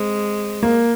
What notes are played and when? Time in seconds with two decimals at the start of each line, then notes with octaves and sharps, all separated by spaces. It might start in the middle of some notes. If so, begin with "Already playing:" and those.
Already playing: G#3 C4
0.63 A#3